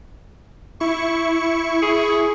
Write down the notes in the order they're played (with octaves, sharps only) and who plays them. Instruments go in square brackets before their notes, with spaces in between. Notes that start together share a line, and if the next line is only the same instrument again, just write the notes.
[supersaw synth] E4 C#6
[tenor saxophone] G#4